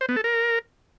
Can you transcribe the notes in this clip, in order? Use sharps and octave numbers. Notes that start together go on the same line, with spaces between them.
C5
B3
A4
A#4